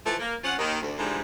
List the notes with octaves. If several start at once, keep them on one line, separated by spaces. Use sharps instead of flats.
E3 F3 A3 A4
A#3
F3 C#4 F4 F#5
D#2 D#3
D2
G#2 D3 E3 F3 G3